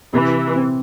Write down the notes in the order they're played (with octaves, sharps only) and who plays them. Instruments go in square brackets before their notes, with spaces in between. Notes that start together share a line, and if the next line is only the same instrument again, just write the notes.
[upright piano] C3 [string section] E3
[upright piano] C4